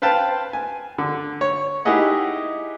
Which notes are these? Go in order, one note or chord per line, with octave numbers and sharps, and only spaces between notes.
B4 C5 F5 G5 A5
G#5
D3
C#5
D#4 E4 G4 G#4 D#5 F#5